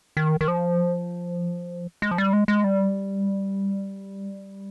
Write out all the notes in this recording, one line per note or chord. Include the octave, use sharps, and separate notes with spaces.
D#3
D#3
F3
G#3
F3
G3
G#3
G#3
G3